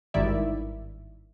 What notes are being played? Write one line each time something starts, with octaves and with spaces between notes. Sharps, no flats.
G#1 G2 D#3 E4 D5 E5